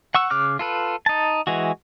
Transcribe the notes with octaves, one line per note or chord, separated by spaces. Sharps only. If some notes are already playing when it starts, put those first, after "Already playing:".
F#5 C#6 E6
C#3 D6 F6 F#6
F4 A4 B4
D#4 A5
E3 G#3 F#4